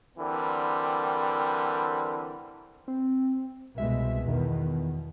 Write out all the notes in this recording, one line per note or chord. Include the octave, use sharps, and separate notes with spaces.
D3 E3 G3 C4 A#4
C4
C2 B2 G#3 E5
E2 B2 D#3